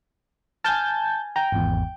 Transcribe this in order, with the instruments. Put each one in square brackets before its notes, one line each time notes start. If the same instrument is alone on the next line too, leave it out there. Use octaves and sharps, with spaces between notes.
[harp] G#5 F6 [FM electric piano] A5 G6 A6
[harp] G5 [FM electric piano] A#5
[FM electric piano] G#1 E2